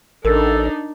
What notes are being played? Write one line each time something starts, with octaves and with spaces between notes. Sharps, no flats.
A1 D4 D#4 A4 A#4